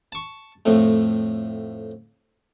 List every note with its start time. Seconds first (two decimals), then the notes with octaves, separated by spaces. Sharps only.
0.12 A5 C#6
0.66 F2 A2 A3